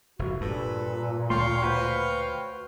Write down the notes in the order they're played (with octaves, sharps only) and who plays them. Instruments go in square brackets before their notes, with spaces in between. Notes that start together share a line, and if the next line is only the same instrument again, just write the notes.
[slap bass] F1 [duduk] F#4
[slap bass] G2 [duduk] A#2 [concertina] A4 B4
[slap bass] D2 A3 [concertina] C#5 F5 G5 [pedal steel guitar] C6
[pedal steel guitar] F#4 B4 C5